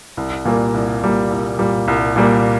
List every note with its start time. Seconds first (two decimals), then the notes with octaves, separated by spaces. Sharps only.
0.17 C2
0.45 A#2 G3 A#3
0.74 C2
1.02 A#2 G3 A#3
1.30 C2
1.59 A#2 G3 A#3
1.88 C2
2.16 A#2 G3 A#3